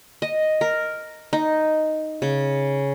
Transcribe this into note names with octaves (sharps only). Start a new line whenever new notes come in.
D#5
A#4
D#4
C#3